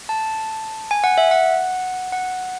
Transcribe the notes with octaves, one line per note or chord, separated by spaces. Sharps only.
A5
G#5
F#5
E5
F#5
F#5